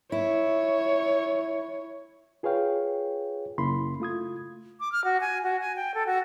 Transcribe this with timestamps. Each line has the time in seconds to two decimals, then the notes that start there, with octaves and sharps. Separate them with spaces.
0.12 E4 C#5
2.43 F4 G#4 B4 C#5 F5 G5
3.58 F#2 C#3 A#3 E4 B5 C6
4.00 A3 F4 D#6 G#6
4.80 D6
4.92 F6
5.04 F#4
5.21 G#5
5.44 F#4
5.61 G#5
5.76 G5
5.94 A4
6.07 F#4